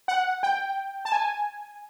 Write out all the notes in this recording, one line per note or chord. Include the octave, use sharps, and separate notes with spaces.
F#5
G5
A5
G#5